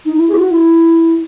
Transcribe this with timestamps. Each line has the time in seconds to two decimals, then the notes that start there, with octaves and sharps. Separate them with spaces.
0.05 D#4
0.17 E4
0.29 G#4
0.34 E4
0.39 F#4
0.51 E4